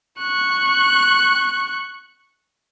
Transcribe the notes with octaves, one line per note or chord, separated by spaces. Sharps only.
C#6 F#6